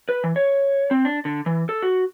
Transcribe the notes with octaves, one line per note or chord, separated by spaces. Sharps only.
B4
E3
C#5
C4
D4
D3
E3
A4
F#4